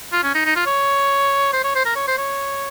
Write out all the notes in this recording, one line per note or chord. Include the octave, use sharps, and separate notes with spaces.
F4
C#4
D#4
D#4
F4
C#5
C5
C#5
C5
A#4
C#5
C5
C#5